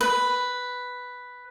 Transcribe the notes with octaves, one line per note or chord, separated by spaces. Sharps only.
B4